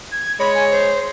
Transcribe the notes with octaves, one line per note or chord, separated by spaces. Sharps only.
G#6
G#3 C#5 B5
G#5
C5